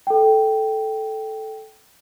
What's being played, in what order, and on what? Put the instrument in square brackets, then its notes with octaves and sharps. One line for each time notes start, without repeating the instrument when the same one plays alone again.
[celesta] A4 G5